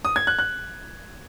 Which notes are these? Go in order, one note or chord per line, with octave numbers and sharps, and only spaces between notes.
D#6
G#6
F#6
F#6